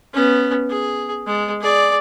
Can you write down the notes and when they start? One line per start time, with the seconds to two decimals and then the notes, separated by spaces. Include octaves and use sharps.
0.13 B3 C#4
0.70 G#4
1.27 G#3
1.60 G#4 D5